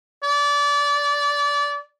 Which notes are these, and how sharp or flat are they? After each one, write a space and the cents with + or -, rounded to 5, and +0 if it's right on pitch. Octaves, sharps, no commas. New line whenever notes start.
D5 -25